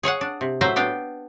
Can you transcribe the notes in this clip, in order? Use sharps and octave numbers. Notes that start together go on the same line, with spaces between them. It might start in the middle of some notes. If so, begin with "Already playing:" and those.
G#4 C#5 F5 F#5
D4
C3
A2 F#3 C5 E5 F5 A#5
B3 D4 F5 G5